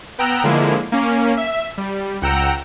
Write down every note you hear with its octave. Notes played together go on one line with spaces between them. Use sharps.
B3 G5 A#5 E6 F#6
D3 F3 G#3 A#3 E4
A#3 C#4
E5
G3
C#2 F#5 G5 A#5 E6